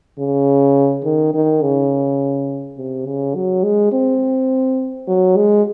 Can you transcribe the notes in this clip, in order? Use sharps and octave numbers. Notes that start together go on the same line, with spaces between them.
C#3
D#3
D#3
C#3
C3
C#3
F#3
G#3
C4
F#3
G#3